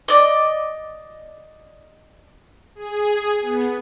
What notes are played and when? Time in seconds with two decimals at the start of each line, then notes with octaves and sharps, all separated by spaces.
0.08 D5 D#5
2.75 G#4
3.41 B3